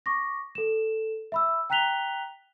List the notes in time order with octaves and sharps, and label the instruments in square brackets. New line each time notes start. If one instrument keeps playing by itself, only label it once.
[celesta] C#6 D6 A#6
A4 E7
E5 B5 E6
G5 A#5 F#6 B6 F7 G7